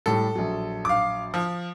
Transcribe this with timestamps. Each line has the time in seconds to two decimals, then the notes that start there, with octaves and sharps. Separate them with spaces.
0.06 A2 G3 A4
0.35 A#1 F#3
0.85 F5 D6
1.34 F3